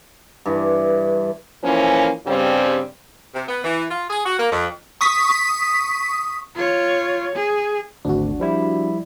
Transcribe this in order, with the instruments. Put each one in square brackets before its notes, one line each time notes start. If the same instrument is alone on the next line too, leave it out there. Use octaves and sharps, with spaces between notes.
[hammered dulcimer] G2 E3
[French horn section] E3 F3 A#3 C#4
G2 C#3 G3 C4
[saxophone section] C3
B3
E3
F4
G#4
F#4
A#3
F2
[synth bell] C#6 D#6 B6
[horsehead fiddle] F4 C#5
G#4
[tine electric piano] G#1 D2 [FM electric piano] D4 F#4
[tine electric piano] F3 G3 E4